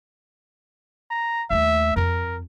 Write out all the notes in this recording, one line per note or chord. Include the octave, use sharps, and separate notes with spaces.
A#5
D#2 A3 E5
F2 A#4